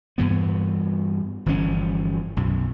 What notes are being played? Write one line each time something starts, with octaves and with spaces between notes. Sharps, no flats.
G2 E3 B3
G1 E3 F3 C#4
B1 F#2